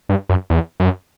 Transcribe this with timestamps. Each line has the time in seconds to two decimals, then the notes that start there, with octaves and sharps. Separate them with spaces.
0.09 G2
0.29 F#2
0.50 E2
0.80 F#2